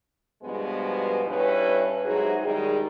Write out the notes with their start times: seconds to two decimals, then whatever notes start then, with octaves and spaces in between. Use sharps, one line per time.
0.43 G2 B2 F3 G#3 B3
1.27 G2 C#4 E4 B4
2.05 G#2 C3 F#3 D#4 F#4 G#4
2.44 D#3 G3 G#3 D#4 E4 G#4